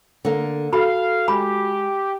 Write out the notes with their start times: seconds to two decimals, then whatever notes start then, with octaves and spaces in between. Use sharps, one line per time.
0.25 D3 A#3
0.73 F#4 A4 F5 B5
1.28 G#3 G4 B5